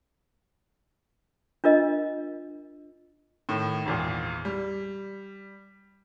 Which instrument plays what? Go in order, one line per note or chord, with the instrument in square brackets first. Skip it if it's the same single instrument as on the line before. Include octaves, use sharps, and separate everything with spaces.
[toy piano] D4 F4 A#4 D#5
[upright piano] A2 D#3
G#1 E2 A#2
G3